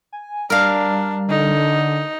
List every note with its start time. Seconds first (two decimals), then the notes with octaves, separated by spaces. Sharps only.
0.13 G#5
0.50 G3 D4 A#4 F5
1.29 D3 D#4